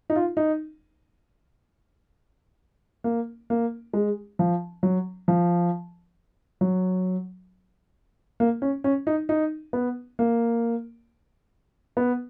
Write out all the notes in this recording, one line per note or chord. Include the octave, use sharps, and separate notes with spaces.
D#4
F4
D#4
A#3
A#3
G#3
F3
F#3
F3
F#3
A#3
C#4
C#4
D#4
D#4
B3
A#3
B3